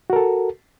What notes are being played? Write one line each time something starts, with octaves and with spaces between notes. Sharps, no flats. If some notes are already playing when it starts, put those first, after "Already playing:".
F#4 A4 A#4